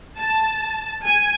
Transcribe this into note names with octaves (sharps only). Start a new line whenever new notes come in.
A5
G#5